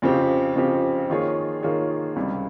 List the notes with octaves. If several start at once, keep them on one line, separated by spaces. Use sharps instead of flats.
F2 C#3 F3 C4 G4
F2 C#3 F3 C4 G4
D#3 A#3 F4 G#4 C#5
D#3 A#3 F4 G#4 C#5
C#2 C3 G3